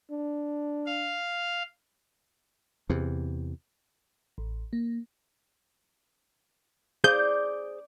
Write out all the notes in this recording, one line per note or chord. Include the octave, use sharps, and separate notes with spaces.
D4
F5
E2 C3
A1
A#3
G#4 C5 D5 F5 D6 G6